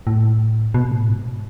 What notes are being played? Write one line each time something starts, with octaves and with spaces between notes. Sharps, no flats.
A2
B2
A2
G#2